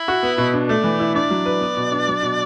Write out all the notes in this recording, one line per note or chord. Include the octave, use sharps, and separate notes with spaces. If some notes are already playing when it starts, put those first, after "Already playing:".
Already playing: E4
F#4
B3
B2
D4
A3 D5
E3
E4
D4 D5
F#3
B4
B3
B2
D4
F#3
B2